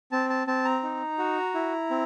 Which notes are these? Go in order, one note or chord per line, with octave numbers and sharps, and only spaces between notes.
C4 A5
A5
C4 A5
A#5
D#4
F#4
E4
C4